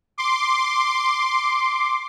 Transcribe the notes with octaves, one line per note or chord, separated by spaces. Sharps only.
C6 D6